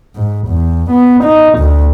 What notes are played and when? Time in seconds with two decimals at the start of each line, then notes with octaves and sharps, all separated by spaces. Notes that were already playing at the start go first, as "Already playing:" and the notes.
0.16 G#2
0.48 E2
0.91 B3
1.24 D#4
1.59 D2